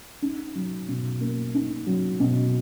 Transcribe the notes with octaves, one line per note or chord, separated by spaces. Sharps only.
D#4
F#3
B2
A#3
D#4
F#3
B2